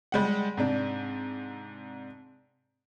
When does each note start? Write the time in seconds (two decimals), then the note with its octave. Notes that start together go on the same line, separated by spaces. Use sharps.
0.12 G3 G#3 F#5
0.57 G#2 C3 D4